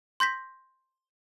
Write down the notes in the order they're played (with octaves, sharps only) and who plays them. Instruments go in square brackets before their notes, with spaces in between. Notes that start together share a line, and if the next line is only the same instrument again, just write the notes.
[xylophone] C6 G6 A#6 B6